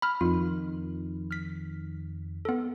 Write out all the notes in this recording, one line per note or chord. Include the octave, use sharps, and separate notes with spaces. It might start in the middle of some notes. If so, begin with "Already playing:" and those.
B5 F6
F2 D#3 F4
F6 B6
B3 A4